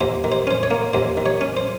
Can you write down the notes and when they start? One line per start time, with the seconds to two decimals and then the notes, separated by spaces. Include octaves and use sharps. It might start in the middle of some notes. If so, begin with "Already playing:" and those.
0.01 D#2 C5
0.24 D#3
0.32 C5
0.47 C#4 C5
0.63 C#5
0.71 A#3
0.93 D#2 C5
1.17 D#3
1.26 C#5
1.41 C#4
1.57 C5